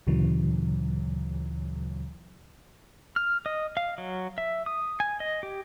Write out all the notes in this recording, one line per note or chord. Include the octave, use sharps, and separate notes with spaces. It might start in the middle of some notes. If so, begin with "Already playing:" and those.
D2 A#2 C#3 E3 F#3
F6
D#5
F5
F#3
E5
D#6
G#5
D#5
G4